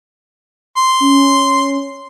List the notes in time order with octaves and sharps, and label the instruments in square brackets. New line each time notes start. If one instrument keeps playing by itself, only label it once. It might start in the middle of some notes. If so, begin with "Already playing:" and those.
[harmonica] C6
[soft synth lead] C#4